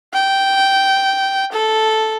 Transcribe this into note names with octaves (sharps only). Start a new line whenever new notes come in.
G5
A4